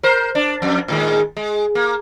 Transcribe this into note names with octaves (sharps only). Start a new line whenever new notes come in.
A#4 C5
D4
F2
A2 D#3 G#3
G#3
A#3